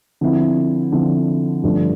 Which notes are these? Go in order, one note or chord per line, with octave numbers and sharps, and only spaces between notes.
D3 F3 C4 E4
D3 F3 C4 E4
G2 D3 F3 A3 D4